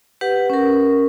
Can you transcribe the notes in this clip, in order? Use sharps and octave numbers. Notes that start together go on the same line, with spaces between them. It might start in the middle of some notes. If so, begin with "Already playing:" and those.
G4 B4 F#5
C#4 A#4